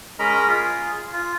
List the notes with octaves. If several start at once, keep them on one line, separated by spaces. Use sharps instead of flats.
G#3 C#4 A#4 D#5 A#5 B5
F4 G#4
F4